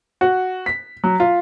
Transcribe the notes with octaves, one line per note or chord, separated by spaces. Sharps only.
F#4
B6
F#3
F4